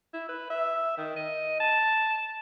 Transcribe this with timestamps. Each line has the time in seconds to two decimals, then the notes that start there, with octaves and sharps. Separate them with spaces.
0.14 E4
0.29 B4
0.50 E5
0.97 D#3
1.16 D#5
1.60 A5